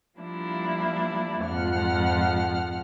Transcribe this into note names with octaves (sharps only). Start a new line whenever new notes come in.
F3 G3 A#3 D4 E4
F2 G#2 F3 F#5 F6